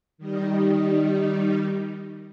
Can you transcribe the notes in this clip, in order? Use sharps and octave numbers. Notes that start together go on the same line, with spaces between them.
D#3 G3 D#4